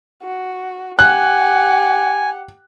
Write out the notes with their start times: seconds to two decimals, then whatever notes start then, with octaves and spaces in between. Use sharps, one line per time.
0.23 F#4
0.99 G4 F#5 G#5 F#6